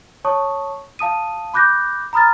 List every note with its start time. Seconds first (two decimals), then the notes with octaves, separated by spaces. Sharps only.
0.25 C#5 A5 C#6 D#6
0.99 F5 A5 D#6 D#7
1.54 B5 D6 F#6 G6 A#6
2.13 A#5 B5 D#6 F6 A6